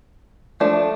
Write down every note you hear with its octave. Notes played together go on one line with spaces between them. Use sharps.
F3 A3 D4